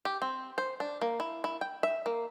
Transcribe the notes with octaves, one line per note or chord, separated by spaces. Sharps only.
G4
C4
C5
D4
A#3
E4
E4
G5
E5
A#3